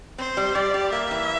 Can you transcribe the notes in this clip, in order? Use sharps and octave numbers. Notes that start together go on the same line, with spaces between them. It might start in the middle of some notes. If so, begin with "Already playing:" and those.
C4 C5
G3
G3 D5
G4
A#3 E5
E3